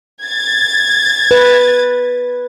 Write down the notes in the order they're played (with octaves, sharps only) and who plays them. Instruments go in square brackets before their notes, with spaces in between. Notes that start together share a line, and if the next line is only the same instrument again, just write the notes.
[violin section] G#6 A6
[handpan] B4